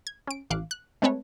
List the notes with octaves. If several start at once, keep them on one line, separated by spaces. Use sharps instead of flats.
G#6
C#4 D7
A1 F5 D6 F#6
F#6
G#3 A3 C4 A4 B4 C#5